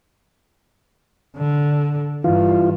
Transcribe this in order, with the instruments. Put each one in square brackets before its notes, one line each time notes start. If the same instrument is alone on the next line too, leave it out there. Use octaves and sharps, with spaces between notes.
[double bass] D3
[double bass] G2 G3 [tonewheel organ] E3 F4